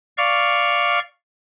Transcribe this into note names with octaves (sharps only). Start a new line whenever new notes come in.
D5 F5 C#6 F6